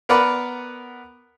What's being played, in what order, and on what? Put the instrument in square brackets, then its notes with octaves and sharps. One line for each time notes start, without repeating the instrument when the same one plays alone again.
[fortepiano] B3 A#4 B4 D5 F#5 B5